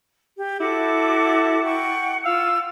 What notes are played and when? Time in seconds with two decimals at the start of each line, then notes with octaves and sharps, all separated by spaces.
0.37 G4
0.61 E4 F#4 A4 D6
1.65 F#5 G5 C#6
2.26 F4 F5 E6